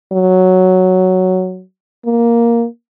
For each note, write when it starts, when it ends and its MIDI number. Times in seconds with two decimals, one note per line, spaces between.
0.13 1.62 54
2.06 2.65 58